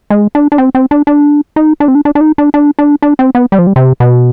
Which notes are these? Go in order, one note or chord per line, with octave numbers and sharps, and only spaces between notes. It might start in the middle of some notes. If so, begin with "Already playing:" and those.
G#3
D4
D4
C4
C4
D4
D4
D#4
D4
C4
D4
D4
D4
D#4
D4
D4
D4
D4
C4
B3
G3
F3
G3
C3
B2